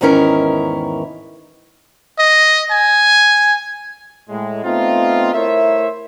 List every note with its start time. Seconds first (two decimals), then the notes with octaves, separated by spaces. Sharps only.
0.01 E2 G#2 D#3 C#4 E4 A#4
2.19 D#5
2.71 G#5
4.29 A2 G#3
4.64 A3 B3 C4 D#4 F4
5.34 A3 E4 A#4 C5 C#5 E5